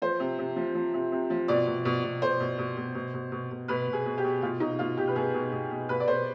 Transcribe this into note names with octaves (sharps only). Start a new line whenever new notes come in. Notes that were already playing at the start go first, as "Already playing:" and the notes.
F3 C5
C3
C3
F3
F3
C3
C3
F3
B2 D5
B2
B2
B2
B2 C5
B2
B2
B2
B2
B2
B2
B2
B2 B4
B2
G#4
B2
G4
B2
B2 F4
B2 D#4
B2 F4
B2 G4
B4
B2 G#4
B2
B2
B2
B2 B4
D5
B2 C5